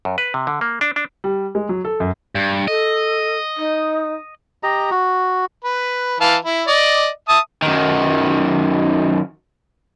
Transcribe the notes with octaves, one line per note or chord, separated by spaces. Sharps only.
F#2
B4
C3
D3
A#3
D4
D4
G3
G#3
F#3
A4
F#2
G2
A4 D#5
D#4
G4 D#5 A#5
F#4
B4
E3 F5 A5
E4
D5 D#5
E5 A5 D#6
F#2 D#3